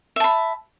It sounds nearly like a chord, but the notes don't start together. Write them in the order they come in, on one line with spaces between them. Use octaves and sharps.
E5 A5 B5